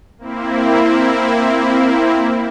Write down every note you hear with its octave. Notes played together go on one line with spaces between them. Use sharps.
A#3 C4 E4